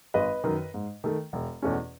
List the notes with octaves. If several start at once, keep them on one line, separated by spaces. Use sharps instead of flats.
G#1 B4 D#5
F#2 D#3
G#2
D#3 A3
E1
E2 B2 A3 C#4